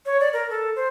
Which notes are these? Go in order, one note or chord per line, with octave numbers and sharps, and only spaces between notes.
C#5
D5
A#4
A4
C5